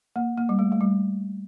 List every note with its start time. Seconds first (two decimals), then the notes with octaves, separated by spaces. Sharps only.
0.16 A#3
0.37 A#3
0.49 G3
0.59 A3
0.72 A3
0.81 G3